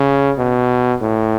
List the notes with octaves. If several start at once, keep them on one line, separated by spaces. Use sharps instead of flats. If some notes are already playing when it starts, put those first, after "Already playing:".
Already playing: C#3
B2
A2